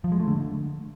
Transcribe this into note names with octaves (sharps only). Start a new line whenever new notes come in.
F3
G#3
A3
D3